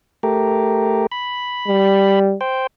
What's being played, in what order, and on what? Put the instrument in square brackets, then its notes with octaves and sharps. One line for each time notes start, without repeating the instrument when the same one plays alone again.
[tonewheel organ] A3 G4 A#4
B5
[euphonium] G3
[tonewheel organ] C5 G5